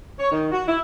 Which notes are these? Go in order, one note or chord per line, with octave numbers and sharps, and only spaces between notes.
C#5
D#3
F#4
E4